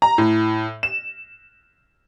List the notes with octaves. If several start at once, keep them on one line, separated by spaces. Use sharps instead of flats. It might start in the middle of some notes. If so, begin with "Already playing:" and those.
A#5
A2
E7